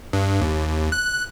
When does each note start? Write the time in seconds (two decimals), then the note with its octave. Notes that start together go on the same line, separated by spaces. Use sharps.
0.13 G2
0.41 D#2
0.92 F#6